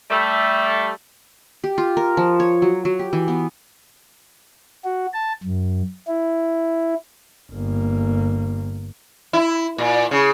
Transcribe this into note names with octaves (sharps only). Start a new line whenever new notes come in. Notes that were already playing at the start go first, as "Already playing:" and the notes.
G3 A3
G4
F4
A#4
F3
C#5
F#3
F#3
G4
E3
B3
F#4
A5
F#2
E4
G1 A#3
E4
A#2
C#3